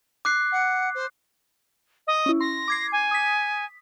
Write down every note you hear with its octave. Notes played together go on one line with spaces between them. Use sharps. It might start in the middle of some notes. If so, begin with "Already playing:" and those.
D6 F#6 C7
F#5
C5
D#5
C#4 E4
C6 A#6
D6 G#6 C7
G#5
D#6 B6